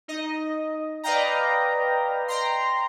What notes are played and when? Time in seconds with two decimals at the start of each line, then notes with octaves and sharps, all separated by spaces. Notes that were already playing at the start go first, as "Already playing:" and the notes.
0.08 D#4 D#5
1.03 B4 D5 D#5 F5 G5 A#5
2.28 G5 A#5 C6